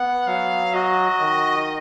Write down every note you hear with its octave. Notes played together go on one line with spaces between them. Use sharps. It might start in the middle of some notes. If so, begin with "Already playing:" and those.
Already playing: B3 F#5
F#3 F5
F#4 D#5
D#3